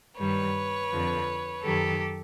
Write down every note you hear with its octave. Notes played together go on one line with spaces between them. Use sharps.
G2 D#3 G3 B4 C#5
F2 D3 F3
F#2 D#3 F#3 G4 A4